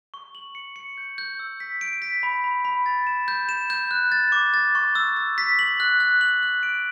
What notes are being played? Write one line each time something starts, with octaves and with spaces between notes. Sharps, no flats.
C#6
F#7
C#7
C#7
G6
G6
E6
B6
D7
B6
B5
B5
B5
A6
E7
G6
E7
G6
F#6
A6
D6
A6
C#6
E6
E6
B6
F#7
F#6
F#6
F#7
F#6
D7